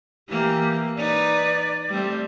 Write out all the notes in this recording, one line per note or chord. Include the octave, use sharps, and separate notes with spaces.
E3 A#3 G4
D#4 B4 D5
G3 A3 C4